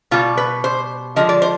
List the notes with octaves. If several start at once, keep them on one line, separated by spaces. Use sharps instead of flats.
B2 G3 F4
B4
C5
D3 F3 G#3 D#5
D5
C5